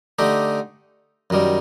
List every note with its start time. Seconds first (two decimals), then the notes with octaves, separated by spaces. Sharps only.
0.19 D3 A3 D#4 G4
1.30 F#2 D#3 G3